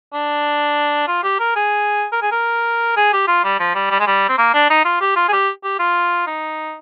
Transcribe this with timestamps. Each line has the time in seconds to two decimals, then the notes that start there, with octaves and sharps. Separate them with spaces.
0.14 D4
1.07 F4
1.23 G4
1.39 A#4
1.56 G#4
2.12 A#4
2.22 G#4
2.32 A#4
2.96 G#4
3.13 G4
3.27 F4
3.44 G3
3.60 F3
3.75 G3
3.91 G3
3.99 G#3
4.07 G3
4.29 C4
4.38 A#3
4.54 D4
4.70 D#4
4.85 F4
5.01 G4
5.16 F4
5.28 G#4
5.33 G4
5.64 G4
5.79 F4
6.27 D#4